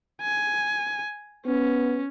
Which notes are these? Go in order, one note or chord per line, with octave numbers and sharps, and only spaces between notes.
G#5
B3 C#4